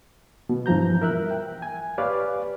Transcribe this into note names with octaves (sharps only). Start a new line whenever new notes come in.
B2
G2 E3 F3 A#5 G6
A#4 E5 F#6
G5
G#5
G4 B4 C#5 D5 F5